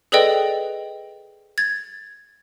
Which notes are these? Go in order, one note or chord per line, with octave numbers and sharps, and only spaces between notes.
G#4 A4 B4 D5 D#5 G5
G#6 A6